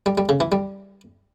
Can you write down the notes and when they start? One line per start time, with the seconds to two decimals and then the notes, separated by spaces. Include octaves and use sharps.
0.06 G3
0.18 G3
0.29 C#3
0.40 E3
0.52 G3